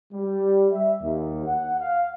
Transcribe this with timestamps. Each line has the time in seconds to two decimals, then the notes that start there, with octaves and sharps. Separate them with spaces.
0.12 G3
0.72 E5
1.01 D#2
1.46 F#5
1.79 F5